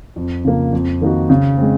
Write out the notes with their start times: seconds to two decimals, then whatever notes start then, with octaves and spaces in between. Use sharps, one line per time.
0.16 F2
0.45 C#3 F3 A#3
0.73 F2
1.02 D#3 A#3 D#4 F#4
1.30 C#3
1.58 G#3 C4